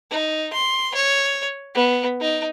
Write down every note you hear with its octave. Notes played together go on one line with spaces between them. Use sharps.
D#4
C6
C#5
B3
D#4